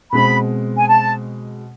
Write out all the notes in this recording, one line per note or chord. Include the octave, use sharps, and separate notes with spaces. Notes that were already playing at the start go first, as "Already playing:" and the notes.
B2 G#3 C4 B5
G#5
A5